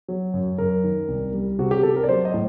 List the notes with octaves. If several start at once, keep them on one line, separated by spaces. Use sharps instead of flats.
F#3
F#2
F#2 A#4
D#3
C2
G3
C3 F#4
G4
C3 A4
A#4
D5
F#3 C5
D#5
A2